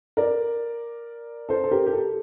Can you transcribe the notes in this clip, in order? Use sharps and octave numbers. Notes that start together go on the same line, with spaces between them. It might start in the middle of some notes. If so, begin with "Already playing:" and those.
A#4 D5
A4 C5
A4
G4 A#4
G4
A4